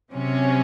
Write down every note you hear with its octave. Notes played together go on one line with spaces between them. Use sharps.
C3 F#3 C#4